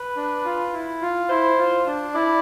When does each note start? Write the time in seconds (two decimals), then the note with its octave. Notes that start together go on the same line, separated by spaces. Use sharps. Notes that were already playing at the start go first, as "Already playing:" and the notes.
Already playing: B4
0.17 D4
0.45 F4
0.73 E4
1.01 F4
1.30 E4 C5
1.58 F4
1.86 D4
2.15 E4 D5